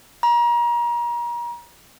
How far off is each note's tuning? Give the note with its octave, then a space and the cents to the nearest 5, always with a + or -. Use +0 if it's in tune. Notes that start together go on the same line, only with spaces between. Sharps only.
A#5 +35